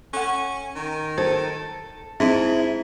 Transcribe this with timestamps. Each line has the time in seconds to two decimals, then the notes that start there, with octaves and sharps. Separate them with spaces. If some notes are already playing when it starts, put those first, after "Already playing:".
0.14 C#4 A4 F#5
0.75 D#3
1.18 A4 C5
2.20 G#2 C4 E4